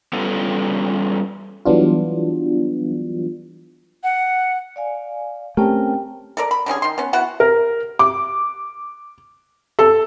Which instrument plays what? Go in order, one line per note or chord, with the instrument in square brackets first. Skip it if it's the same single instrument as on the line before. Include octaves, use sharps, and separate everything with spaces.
[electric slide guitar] G3 B3 C#4 F4 A4 B4
[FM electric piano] E3 F#3 G3 B3 D4 F4
[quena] F#5
[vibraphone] D5 F5 G#5
[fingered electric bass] A3 [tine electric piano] C4 C#4 A#4 [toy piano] G4 A5 [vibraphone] G5
[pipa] A4 A#4 D5
B5
D3 G3 C#4 G#4
D#3 C6
B3 C#4
B3 E4 F#4 F#5
[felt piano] A#4
D6
A4